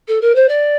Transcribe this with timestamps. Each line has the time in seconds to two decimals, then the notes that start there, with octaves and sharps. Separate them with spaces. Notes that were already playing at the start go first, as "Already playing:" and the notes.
0.08 A4
0.21 A#4
0.35 C5
0.48 D5